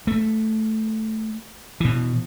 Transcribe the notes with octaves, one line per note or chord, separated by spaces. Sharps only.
A3
B2 E3